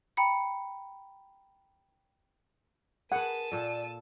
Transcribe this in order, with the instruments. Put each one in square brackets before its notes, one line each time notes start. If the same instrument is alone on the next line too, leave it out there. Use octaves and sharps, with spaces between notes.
[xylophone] G5 A#5 B5 C#7
[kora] G#4 B4 [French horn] A#4 [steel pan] F#5 [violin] A5 D#7
[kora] A#2 A4 [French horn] D5